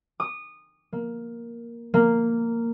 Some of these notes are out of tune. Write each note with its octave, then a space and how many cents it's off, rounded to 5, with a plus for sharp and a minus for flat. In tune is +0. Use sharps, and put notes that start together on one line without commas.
D#6 -20
A#3 +5
A#3 -10